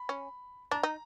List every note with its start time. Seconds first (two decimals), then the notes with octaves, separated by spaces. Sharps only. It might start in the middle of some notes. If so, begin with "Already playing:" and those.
Already playing: B5
0.09 C#4
0.71 D4 A#5
0.83 D#4